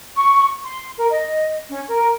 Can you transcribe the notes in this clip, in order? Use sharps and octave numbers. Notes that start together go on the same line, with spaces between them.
C#6
C6
A#4
D#5
C#4
A#4